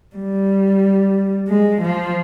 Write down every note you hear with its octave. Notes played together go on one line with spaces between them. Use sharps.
G3
G#3
F3